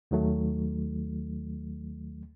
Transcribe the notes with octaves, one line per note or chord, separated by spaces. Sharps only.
D#2 D#3 F#3 A3